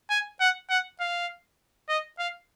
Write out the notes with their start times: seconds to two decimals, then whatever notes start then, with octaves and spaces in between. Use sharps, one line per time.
0.10 G#5
0.40 F#5
0.70 F#5
1.00 F5
1.89 D#5
2.19 F5